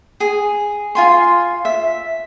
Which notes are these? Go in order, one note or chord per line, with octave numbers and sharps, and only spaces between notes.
G#4
F4 G#5 C6
E5